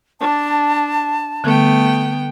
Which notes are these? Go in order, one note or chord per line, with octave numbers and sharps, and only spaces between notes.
D4 A5
D3 G3 A3 B3 G5